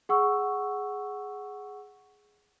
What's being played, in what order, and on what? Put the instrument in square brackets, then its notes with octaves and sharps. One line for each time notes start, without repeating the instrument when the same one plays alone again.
[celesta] G#4 F#5 C#6 E6